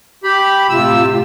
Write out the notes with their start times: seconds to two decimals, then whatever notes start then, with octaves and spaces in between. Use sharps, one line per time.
0.23 G4 B5
0.69 A2 C3 F4 G4 E6